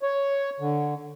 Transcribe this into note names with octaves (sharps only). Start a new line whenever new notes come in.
C#5
D3